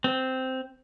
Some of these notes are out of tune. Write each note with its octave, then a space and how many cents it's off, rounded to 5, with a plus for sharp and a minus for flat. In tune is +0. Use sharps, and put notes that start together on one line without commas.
C4 -5